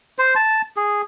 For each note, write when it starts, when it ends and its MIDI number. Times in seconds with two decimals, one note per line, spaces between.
0.19 0.34 72
0.36 0.62 81
0.76 1.02 68